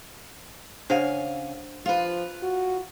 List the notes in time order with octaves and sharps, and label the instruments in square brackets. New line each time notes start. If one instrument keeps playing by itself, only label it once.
[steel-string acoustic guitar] C#3 F5 G#5 [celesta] D4 C5 F#5
[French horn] F3 [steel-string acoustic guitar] F4 B4
[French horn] F#4